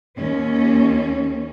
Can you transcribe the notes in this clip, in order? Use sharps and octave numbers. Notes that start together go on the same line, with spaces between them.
D#2 C#4